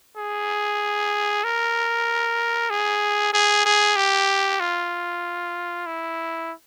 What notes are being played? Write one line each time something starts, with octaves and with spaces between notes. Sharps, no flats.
G#4
A#4
G#4
G#4
G#4
G4
F4
E4